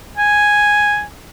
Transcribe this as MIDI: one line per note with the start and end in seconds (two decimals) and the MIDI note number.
0.18 1.03 80